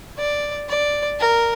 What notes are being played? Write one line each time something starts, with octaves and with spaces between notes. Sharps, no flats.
D5
D5
A#4